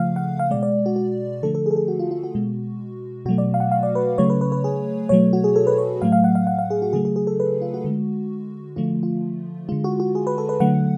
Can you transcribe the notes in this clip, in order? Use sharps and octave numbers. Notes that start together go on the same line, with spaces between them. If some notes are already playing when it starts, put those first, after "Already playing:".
Already playing: C#3 F3 A3 F5
F#5
F5
B2 G#3 D5
D5
F#4
F#4
D3 F3 A3 A4
A4
G#4
A4
G#4
F#4
F4
F4
F#4
B2 G#3
B2 F#3 A3 F#4
D5
F5
F#5
F5
D5
B4
C#3 F#3 A3 C#5
B4
B4
B4
G#4
B2 F#3 A3 C#5
F#4
G#4
A4
B4
C#5
A2 F#3 A3 F5
F5
F#5
F5
F#5
F5
G#4
F#4
C#3 F#3 A3 G#4
G#4
G#4
A4
B4
F4
F#4
D3 G#3
D3 F3 A3 F4
F4
D3 G#3 F4
F#4
F#4
G#4
B4
A4
B4
D3 F#3 A3 F#5